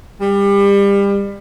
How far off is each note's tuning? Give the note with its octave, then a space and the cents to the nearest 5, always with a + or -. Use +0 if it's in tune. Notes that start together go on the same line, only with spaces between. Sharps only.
G3 +30